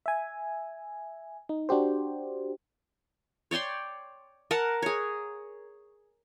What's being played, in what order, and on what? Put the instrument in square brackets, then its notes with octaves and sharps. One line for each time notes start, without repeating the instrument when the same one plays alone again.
[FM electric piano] E5 G#5
D#4
D4 F#4 G4 C5
[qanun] C#5 D5 G5 C6
A#4 F#5 A5
G#4 C#5